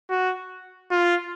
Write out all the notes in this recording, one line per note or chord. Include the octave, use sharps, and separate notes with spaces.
F#4
F4